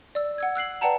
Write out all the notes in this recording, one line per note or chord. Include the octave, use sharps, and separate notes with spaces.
D5 E6
F#5 E6 G#6
E6 F#6 C7 F#7
B4 D5 F#5 G5 A5 A#5